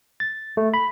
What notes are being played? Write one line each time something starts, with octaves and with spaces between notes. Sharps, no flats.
A6
A3
B5